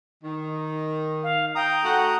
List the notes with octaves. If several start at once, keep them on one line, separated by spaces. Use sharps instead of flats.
D#3
F5
G5 A#5 D#6
A3 F#4 F#5